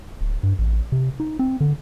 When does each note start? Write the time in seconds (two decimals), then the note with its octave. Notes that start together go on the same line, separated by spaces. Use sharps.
0.21 D1
0.43 G2
0.59 A1
0.92 C3
1.20 D#4
1.39 C4
1.61 D3